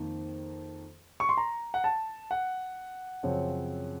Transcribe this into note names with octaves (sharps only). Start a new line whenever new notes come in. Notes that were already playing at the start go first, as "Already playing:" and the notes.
Already playing: F2 D#3 A#3
C#6
C6
A#5
F#5
A5
F#5
F#2 C#3 F3 C4